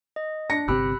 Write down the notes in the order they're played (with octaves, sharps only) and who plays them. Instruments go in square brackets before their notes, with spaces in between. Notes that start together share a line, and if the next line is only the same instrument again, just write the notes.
[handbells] D#5
[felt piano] D4 A#6 C#7
[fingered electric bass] G1 C3 C4 [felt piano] G4 [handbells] B5 E6 F#6